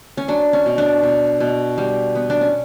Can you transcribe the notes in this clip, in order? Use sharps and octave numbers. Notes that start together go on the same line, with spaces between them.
C#4
F#3 D4
C#4
B2
D4
B2
B2
G3
B3
D4
C#4